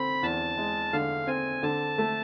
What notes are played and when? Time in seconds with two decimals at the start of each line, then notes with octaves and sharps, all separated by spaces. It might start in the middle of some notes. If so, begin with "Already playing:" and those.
Already playing: D3 C4 B5
0.23 E2 A5
0.58 G#3
0.93 D3 F5
1.27 C4 G#5
1.63 D3 A5
1.98 A3